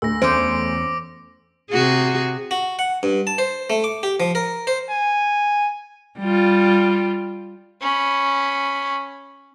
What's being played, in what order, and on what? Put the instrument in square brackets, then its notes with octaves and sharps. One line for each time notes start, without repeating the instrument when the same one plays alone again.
[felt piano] D2 [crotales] E6 A#6
[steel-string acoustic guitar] E2 C#4 [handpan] C5 [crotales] D6 D7
[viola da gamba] C3 F#4 G#4
[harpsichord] F#4
F#5
G2
A5
C5
A3
D6
G4
F3
A#4
C5
[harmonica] G#5
[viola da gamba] G3 F4
[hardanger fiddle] C#4 B5